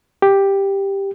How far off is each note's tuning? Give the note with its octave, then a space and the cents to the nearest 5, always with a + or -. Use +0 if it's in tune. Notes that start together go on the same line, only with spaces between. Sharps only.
G4 +5